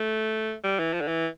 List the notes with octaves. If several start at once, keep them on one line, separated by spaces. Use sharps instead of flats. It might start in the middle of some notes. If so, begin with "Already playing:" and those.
Already playing: A3
G3
E3
F3
D3
E3